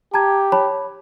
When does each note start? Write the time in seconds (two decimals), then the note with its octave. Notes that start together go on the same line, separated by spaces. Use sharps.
0.14 G4 A5 A#5 G#6
0.52 C#5 A5 B5